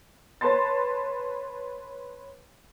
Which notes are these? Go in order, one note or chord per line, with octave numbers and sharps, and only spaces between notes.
B4 C#5 A5 C6 A6